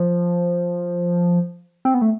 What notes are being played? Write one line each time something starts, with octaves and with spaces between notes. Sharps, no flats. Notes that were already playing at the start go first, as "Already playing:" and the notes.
Already playing: F3
C4
B3
A3